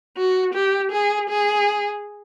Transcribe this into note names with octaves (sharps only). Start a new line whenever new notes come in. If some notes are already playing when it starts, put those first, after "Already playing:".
F#4
G4
G#4
G#4